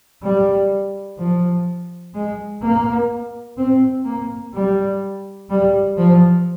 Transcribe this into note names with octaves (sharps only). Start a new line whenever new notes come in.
G3
F3
G#3
A#3
C4
A#3
G3
G3
F3